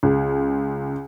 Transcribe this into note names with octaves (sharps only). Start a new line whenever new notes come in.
C#2